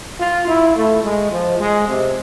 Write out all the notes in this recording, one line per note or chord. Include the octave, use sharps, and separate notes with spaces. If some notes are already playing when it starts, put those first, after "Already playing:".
F4
E4
A3
G#3
F3
G#3
C3